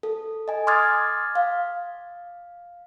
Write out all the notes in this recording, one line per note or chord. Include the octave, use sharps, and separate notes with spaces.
A4
D#5 G#5
C6 D6 D#6 F6 G#6 A6
F5